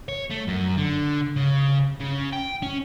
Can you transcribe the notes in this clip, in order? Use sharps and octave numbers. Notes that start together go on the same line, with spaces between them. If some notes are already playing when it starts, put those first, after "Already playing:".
C#5
A3
F#2
D3
C#3
C#3
G5
C#4